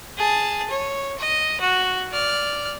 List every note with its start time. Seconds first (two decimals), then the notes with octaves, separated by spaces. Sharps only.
0.17 G#4 A5
0.70 C#5
1.19 D#5
1.61 F#4
2.12 D5 F6